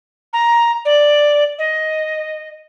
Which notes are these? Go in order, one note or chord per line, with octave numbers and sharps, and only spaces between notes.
A#5
D5
D#5